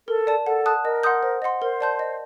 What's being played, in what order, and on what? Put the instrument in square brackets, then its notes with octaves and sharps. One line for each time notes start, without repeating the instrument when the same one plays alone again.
[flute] A4 [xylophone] A#4
[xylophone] D5 A5
[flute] A4 [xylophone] F#5
[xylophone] A5 D#6 F#6
[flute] A#4 [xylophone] D#5
[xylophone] F#5 C6 D#6 G6
C5
D#5 F#5 C6
[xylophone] A#4 [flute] C5
[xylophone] D5 A5 C6 G6
D#5